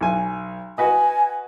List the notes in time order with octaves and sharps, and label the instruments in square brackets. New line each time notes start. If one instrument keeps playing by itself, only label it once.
[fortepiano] B1 G#5
[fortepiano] F#4 B4 D#5 [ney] G#5